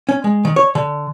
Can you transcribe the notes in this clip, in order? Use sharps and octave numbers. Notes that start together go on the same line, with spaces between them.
C#4
G#3
D#3
C#5
D3